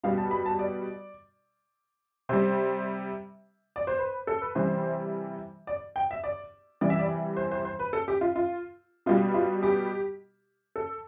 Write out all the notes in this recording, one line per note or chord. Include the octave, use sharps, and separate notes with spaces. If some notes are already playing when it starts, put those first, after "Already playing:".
B2 G3 F5
A5
B5
A5
D5
C3 G3 C5
D5
C5
B4
A4
B4
C3 E3 G3 C5
D5
G5
E5
D5
C3 E3 G3 D5
E5
D5
C5
C5
C5
B4
A4
G4
F4
F4
B2 G3 F4
F4
G4
A4